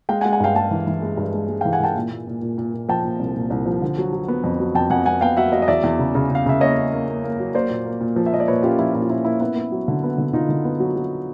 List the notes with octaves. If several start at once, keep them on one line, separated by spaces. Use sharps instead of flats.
G#3 F5 G5
F#5 G#5
G#3
F#5 G#5
G2 F5 G5
G#3 G5 A5
E3
E3
G#3
G2
G#3
G#3
F5 G5
E3
F#5 G#5
E3 G5 A5
A#2
A#2
A#2
A#2
A#2
A#2
F3 G5 A5
A#2
C2
A#2
C2
F3
D3
F#3
F#3
B3
F2
F#3
F2 G5 A5
F2 F#5 G#5
F2 F#5 G#5
B3 F5 G5
F#3 E5 F#5
F#3 D#5 F5
D#5
E2 D5 E5
E2
C#3
C#3
C#3 F5
C#3 E5
A#3 C#5 D#5
A#3
A#3
A#3
A#3
F#3
A#3 C5 D5
A#2
A#3
A#2
F3
E5
A#3 D#5
D5
A#2 B4 C#5
C#4 F4 G4
F3 E4
A#2 E4
F4
C#4 E4
A#3 E4
B3 E4
B3
F#3
D3
B3
D3
D3 D#4 F4
D3
B3
F#3
F#3